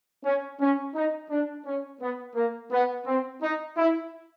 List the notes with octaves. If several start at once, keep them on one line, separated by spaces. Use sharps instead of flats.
C#4
C#4
D#4
D4
C#4
B3
A#3
B3
C4
D#4
E4